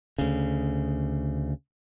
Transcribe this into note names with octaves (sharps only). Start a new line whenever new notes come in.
D2 C#3